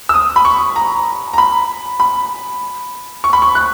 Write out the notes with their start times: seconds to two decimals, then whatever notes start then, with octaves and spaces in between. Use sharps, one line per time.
0.09 E6
0.14 D#6
0.36 B5
0.45 C#6
0.76 A#5
1.34 A#5
1.38 B5
2.00 B5
3.24 C#6
3.33 B5
3.42 C#6
3.55 F#6